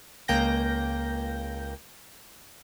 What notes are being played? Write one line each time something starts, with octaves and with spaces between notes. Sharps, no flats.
C#2 A#3 G5 G6 A#6